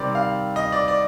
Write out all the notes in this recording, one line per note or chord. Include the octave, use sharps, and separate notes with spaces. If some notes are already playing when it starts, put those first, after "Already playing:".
Already playing: C3 D#3 G3 C4 D5
F5
D#5
D5
D5